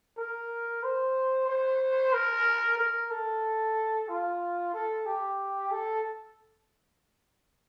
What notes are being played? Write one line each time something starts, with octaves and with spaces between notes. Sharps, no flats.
A#4
C5
C5
A#4
A#4
A4
F4
A4
G4
A4